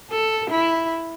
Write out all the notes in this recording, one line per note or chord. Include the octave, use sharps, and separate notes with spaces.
A4
E4